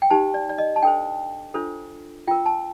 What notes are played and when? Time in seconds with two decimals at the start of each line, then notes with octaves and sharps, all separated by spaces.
0.02 G5
0.10 D#4 G4 C5 A5
0.34 D5
0.49 D5
0.58 D#5
0.76 A5
0.83 D4 A4 C5 G5
1.54 D4 F4 A4 C5
2.28 F4 A#4 G5
2.46 A5